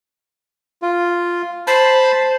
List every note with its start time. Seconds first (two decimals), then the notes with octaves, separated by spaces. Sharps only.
0.82 F4
1.67 C5 A5 B5